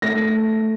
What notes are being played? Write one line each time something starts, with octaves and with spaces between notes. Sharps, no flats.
A3 A#6